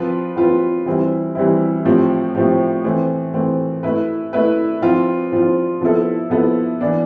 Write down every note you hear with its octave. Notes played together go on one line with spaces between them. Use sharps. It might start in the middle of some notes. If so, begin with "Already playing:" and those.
Already playing: F3 C4 F4 B4
F3 C4 F4 B4
E3 G3 C4 E4
E3 G3 C4 E4
A2 F3 C4 G4
A2 F3 C4 G4
E3 A3 C4
E3 A3 C4
A3 E4 B4
A3 E4 B4
F3 C4 F4
F3 C4 F4
F3 B3 E4 A4
F3 B3 E4 A4
E3 B3 D4